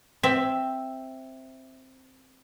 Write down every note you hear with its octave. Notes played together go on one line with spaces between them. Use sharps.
C4 E5